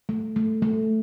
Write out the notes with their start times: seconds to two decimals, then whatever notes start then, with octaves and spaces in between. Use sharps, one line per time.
0.09 A3
0.36 A3
0.62 A3